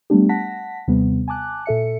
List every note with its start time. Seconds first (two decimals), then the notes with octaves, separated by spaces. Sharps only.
0.10 G3 A3 B3 D4 G4
0.29 F#5 A5 A#6 B6
0.88 D#2 C3 G3 B3
1.28 G#5 A5 D6 F#6
1.66 A#2 A4 E5 C#7